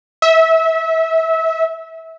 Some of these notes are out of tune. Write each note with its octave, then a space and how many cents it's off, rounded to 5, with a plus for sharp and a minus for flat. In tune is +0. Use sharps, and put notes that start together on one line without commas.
E5 -25